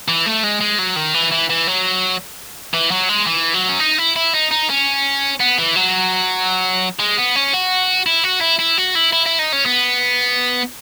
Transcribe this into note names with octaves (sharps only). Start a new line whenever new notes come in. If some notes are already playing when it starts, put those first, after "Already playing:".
E3
A3
G#3
G#3
F#3
D#3
E3
E3
E3
F#3
E3
F#3
G#3
E3
F#3
C#4
D#4
E4
E4
D#4
D#4
C#4
B3
E3
F#3
G#3
B3
C#4
F#4
E4
F#4
E4
E4
F#4
E4
E4
E4
D#4
C#4
B3